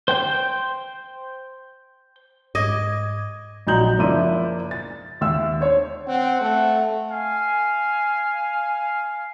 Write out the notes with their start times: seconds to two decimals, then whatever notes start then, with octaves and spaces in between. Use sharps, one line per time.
0.08 C5 G5 G6
2.55 G#2 D#5 D6 G#6
3.67 A#1 F#3 D#4 A#5 G6 F#7
3.98 F#1 F3 A#3 D4 E4 D#7
4.71 A6
5.21 D#2 E5 E6
5.60 D4 C5 C#5
6.07 C4 F#5
6.41 A3
7.12 F5 G#5